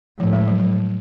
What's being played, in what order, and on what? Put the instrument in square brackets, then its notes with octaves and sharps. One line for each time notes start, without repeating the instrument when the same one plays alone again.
[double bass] A2 [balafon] F3
[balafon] G#3
F#3
F#3